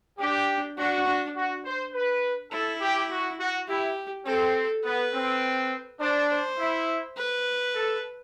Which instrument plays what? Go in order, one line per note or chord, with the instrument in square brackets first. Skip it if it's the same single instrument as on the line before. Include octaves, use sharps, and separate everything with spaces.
[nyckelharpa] D4 [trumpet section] G4
[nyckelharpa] D4 [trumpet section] F#4
[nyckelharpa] D4
[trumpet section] F#4
C5
B4
[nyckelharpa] E4 [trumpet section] A4
[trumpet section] G4
F#4
F#4
[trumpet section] E4 [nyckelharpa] G4
[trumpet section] C4 [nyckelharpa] A4
[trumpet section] B3 [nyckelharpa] B4
[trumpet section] C4
[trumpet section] D4 [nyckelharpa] C5
[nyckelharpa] C5
[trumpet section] E4
[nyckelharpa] B4
[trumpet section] A4